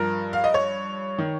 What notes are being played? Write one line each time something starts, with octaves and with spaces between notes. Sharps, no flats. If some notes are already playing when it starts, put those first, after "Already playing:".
Already playing: G2 F3 A#4
F5
D#5
C#5
D#3